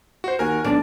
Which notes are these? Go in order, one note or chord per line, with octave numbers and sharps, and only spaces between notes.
F#4 C5
D#2 F#4 A#4 G#5
B1 D4 D5